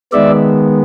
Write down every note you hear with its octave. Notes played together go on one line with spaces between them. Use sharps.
D#3 G#3 B3 D5 E5